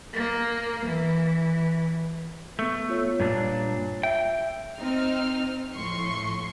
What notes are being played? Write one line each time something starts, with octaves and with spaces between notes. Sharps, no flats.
A#3
E3
A3 B3 C#6
F4 C#5
G2 A#2 D4
E5 G5
C4 D#4 F6
A2 F3 C6 C#6